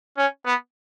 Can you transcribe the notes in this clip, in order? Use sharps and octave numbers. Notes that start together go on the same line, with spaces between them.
C#4
B3